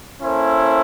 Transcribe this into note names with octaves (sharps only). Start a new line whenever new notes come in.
A#3 C#4 E4 A4 C5